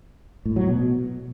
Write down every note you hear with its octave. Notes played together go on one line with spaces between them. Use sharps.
A2
F#3
B2